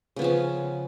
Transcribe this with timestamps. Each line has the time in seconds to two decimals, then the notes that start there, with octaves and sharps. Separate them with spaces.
0.16 C#3
0.19 B3
0.22 F3
0.24 C#4